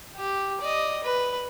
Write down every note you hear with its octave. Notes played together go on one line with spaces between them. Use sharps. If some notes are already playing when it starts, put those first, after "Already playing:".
G4
D5 D#5
B4